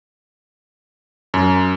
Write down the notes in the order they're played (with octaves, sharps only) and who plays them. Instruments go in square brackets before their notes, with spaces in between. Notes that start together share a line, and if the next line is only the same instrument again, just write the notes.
[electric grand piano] F#2